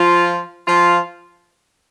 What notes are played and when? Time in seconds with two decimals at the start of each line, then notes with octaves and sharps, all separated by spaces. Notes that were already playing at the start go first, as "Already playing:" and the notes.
Already playing: F3 F4
0.67 F3 F4